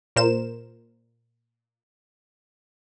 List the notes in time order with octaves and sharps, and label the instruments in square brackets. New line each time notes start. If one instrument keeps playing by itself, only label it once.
[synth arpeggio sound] A#2 A#4 C5 E7